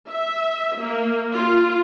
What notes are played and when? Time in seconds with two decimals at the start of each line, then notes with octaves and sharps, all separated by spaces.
0.11 E5
0.79 A#3
1.34 F4